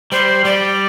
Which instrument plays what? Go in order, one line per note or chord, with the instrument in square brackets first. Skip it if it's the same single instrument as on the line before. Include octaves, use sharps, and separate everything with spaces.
[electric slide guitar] G3 [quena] C5
[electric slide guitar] G3 [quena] D5